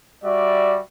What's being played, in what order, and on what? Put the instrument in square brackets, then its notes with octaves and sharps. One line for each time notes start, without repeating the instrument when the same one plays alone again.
[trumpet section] G3 F#4 D5 E5